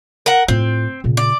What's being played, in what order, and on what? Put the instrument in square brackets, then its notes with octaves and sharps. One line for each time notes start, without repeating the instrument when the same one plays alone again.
[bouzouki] A#4 F#5
[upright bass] A2 F4 [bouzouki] C4
[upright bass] A#2 C#3
[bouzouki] D5